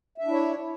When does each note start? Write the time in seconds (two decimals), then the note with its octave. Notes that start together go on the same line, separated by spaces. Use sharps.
0.18 E5
0.23 D4
0.27 E4
0.32 C#5